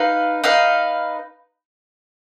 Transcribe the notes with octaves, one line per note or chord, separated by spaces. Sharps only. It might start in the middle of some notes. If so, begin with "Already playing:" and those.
Already playing: D#4 B4 F5
D#4 B4 F5